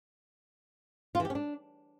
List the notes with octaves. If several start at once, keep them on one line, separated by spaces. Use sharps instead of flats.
F4
E3
G4
C#4
D4